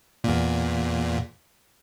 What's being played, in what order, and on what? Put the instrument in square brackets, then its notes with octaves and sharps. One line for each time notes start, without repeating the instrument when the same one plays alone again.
[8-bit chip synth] E2 A#2